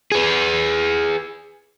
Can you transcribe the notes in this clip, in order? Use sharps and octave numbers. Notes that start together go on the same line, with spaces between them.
G#4 B4